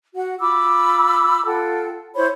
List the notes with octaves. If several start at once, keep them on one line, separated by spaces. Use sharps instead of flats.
F#4 F#5
F4 B5 D6 E6
F4 A4 F#5 G5
E4 C5 C#5 B5